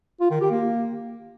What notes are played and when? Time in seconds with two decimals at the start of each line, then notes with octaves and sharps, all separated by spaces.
0.21 F4
0.31 D#3
0.41 G4
0.51 A#3